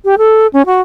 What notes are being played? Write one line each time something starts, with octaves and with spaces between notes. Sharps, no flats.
G4
A4
C#4
F#4